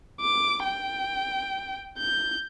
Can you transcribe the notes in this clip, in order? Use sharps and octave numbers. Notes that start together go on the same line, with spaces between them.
D6
G5
G6